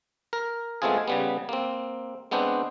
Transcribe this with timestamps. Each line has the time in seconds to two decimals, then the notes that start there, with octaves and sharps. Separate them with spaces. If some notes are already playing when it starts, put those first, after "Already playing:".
0.33 A#4
0.82 G#3 A3 B3 C4 F4 G#4
1.08 C#3 G3 B3
1.49 A#3 C4
2.31 G#3 B3 C4 D4 C5